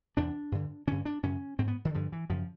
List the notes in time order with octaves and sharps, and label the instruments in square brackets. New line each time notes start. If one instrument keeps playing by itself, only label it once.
[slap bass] E2 C3 D4
G2 D3
G2 D3 C#4
D4
F#2 C#3 C#4
G#2 C4
B3
D#3
G2 D3 F3
E3
F#2 C#3 F3